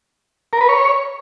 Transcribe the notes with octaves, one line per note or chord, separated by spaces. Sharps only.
A#4
B4
C#5